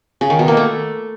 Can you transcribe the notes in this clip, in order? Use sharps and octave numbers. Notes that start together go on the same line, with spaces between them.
C#3
D#3
B2
A#3
A3